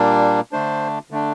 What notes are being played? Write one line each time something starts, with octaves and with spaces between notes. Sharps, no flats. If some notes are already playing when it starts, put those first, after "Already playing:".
Already playing: A#2 G3 A#3 D4
D3 A3 D4 C5
D3 A3 D4